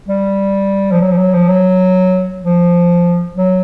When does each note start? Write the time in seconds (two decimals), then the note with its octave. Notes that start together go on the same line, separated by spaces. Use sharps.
0.08 G3
0.92 F3
1.01 F#3
1.11 F3
1.17 F#3
1.34 F3
1.49 F#3
2.42 F3
3.36 F#3